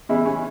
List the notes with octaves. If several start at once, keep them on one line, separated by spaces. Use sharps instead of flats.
E2 C#3 E3 E4
C#4